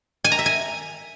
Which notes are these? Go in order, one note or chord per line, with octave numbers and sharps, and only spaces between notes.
G#5
A#5
E5
G#5